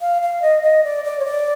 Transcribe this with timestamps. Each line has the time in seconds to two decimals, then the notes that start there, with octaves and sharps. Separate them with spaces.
0.01 F5
0.22 F5
0.42 D#5
0.63 D#5
0.84 D5
1.05 D5
1.20 C#5
1.25 D5